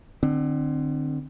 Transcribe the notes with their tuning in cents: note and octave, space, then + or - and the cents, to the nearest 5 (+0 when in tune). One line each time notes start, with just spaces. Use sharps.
D3 +30 C4 +0